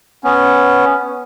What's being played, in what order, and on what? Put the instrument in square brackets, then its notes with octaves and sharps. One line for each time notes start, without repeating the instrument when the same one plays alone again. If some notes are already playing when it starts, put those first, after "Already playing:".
[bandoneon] B3 C#4